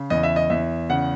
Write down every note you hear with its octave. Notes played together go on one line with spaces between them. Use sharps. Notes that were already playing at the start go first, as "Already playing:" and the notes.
Already playing: C#3
E2 D#5
E5
D#5
E2 E5
C#3 F#5